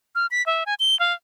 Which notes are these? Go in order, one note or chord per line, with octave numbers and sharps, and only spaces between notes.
F6
B6
E5
G#5
G7
F5